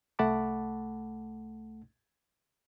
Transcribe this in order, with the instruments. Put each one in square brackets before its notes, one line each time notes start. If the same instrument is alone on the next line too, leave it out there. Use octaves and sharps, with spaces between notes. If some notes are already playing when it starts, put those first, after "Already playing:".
[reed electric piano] C2 A3 F#5 A5 B5 D6